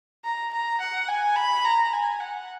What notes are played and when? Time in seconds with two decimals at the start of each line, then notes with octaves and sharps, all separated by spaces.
0.24 A#5
0.53 A#5
0.80 F#5
1.08 G#5
1.36 B5
1.64 A#5
1.93 G#5
2.20 F#5